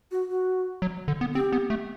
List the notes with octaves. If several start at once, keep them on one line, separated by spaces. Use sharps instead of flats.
F#4
F#4
F#3
D3
B3
C4 G4
B3
A3